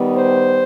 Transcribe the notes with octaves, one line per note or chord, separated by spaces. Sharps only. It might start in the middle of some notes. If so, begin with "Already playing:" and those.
Already playing: D#3 G3 B3
C5